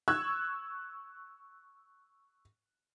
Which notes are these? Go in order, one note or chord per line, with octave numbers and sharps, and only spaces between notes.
C#6 E6 F#6 G#6